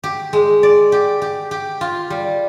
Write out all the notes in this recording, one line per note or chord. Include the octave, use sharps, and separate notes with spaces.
G4
G#3
D5
G4
G4
G4
F4
G3